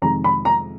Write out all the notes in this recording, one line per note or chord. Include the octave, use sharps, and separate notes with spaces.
F2 C3 D#3 G#3 A#5
B5
A#5